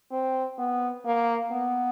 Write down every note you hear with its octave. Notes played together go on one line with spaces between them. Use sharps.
C4
B3
A#3
B3